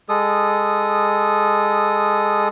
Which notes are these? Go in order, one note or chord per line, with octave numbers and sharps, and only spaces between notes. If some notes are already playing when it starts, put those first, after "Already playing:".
G#3 A4 D#6